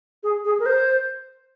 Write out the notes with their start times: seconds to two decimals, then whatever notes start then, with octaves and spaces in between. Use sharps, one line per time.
0.23 G#4
0.44 G#4
0.60 A#4
0.66 C5